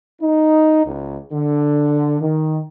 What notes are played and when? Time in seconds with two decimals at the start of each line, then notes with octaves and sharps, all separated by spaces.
0.22 D#4
0.85 C#2
1.33 D3
2.21 D#3